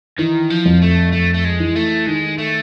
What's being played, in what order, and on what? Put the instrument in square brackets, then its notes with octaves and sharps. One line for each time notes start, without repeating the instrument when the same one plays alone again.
[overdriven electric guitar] D#3 [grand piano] E3
[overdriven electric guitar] F3
[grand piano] F2
[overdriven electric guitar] A3
[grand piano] F2 [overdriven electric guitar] A3
[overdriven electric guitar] A3
G#3
[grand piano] E3
[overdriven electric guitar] A3
[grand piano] D#3 [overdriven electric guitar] G#3
[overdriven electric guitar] A3